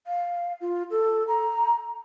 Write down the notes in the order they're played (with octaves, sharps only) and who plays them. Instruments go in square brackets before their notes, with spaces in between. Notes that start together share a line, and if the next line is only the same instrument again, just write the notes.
[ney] F5
F4
A4
A#5